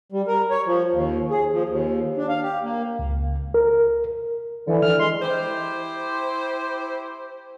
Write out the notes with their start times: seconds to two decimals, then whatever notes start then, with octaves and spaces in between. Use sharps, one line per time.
0.12 G3
0.27 A#4
0.50 C#5
0.66 F3
0.93 D#2
1.30 G#4
1.53 F3
1.69 D#2
2.18 D4
2.29 F5
2.42 G4
2.63 A#3
2.99 C#2
3.54 A#4
4.67 D3 E3
4.82 F6
4.99 G#3 C6
5.22 E4 G4 C5